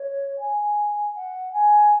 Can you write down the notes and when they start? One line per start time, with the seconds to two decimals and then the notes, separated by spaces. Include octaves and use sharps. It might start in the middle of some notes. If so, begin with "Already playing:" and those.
Already playing: C#5
0.39 G#5
1.15 F#5
1.52 G#5